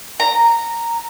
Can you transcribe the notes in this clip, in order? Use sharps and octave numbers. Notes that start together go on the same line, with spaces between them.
A#5